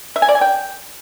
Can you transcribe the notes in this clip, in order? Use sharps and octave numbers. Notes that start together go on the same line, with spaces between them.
E5
G#5
D5
G#5
G5